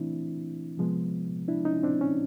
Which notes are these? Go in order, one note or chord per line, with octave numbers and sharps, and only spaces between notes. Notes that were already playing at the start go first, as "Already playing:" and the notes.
Already playing: E3 A3 C4 D4 E4
C3 F3 G#3 B3
D4 E4
C#4 D#4
C4 D4
C#4